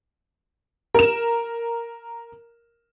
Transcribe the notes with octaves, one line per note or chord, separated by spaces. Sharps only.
A#4 E7